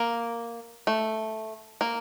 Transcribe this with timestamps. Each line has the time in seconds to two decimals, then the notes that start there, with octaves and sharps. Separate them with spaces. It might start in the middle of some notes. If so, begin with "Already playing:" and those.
Already playing: A#3
0.87 A3
1.81 A#3